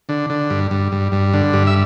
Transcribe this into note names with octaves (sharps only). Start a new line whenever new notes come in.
D3
D3
G2
G2
G2
G2
D3
G2
E5